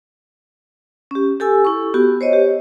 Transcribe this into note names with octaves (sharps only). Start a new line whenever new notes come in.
C#4 G4
G4 A4 G#5 E6
E4 C#6
B3 F#4 G4
C5 C#5 D#5
G4